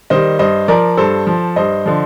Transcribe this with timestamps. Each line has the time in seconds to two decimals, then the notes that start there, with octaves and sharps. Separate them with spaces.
0.10 D#3 G3 C5 D#5
0.39 G2 C5 D#5
0.68 F3 A#4 D5
0.97 G2 A4 C5
1.27 F3
1.56 G2 C5 D#5
1.86 D3 F3